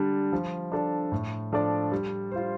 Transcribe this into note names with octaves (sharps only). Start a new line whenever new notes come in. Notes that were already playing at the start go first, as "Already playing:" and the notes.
Already playing: D3 G3 D4
F3
D4 A4 D5
A2
F3 D4 A4 D5
G3
F4 C5